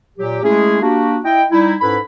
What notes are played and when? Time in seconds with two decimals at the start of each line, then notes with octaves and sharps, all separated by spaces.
0.19 A#2 F#3 G4
0.43 G#3 A3 C#4 E4 G#4
0.82 A#3 D4 F#4 G4
1.24 E4 D#5 G5
1.51 G3 D#4 E4
1.81 G#2 C#4 E4 A4 B4 B5